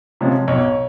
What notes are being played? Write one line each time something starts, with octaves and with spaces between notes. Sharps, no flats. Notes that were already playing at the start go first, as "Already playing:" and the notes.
C3 F3 G#3 C#4
B1 C#5